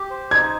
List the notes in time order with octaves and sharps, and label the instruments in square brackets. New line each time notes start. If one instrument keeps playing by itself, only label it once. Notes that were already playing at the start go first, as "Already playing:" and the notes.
Already playing: [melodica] G4
C5
[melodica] D#4 [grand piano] G#6